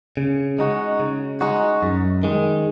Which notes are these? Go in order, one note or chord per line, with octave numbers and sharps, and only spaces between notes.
C#3
G#3 D#4 F#4
C#3
G#3 D#4 F#4
F#2
D#3 G#3